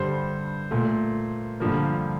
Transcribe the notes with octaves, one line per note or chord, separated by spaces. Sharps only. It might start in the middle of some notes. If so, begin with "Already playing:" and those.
Already playing: G2 D3 G3 C5
A#2 A3
G2 D3 F3 A#3